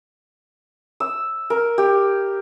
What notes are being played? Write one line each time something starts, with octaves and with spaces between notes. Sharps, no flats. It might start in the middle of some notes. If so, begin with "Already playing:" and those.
E6
A#4
G4